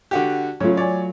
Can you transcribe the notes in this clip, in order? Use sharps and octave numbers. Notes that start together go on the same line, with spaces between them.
D3 F#4 G4
C#3 F#3 A3 F4 C#5
C#5 D5 G#5